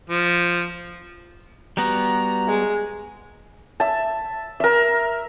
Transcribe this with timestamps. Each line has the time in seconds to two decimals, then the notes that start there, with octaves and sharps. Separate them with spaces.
0.10 F3
1.77 G3 B3 F#4 A#5
2.48 G#3
3.80 E5 A5
4.60 A#4 E5